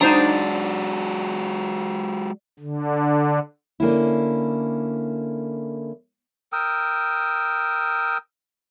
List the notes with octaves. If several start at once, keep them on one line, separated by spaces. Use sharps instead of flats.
F#3 G#3 D4 D#4 F#4 C5 A#5
D3
D3 A#3 C#4 E4
A#4 G5 D#6 E6